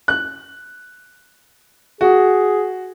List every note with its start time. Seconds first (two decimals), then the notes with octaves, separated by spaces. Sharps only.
0.08 F#6
2.01 F#4 G#4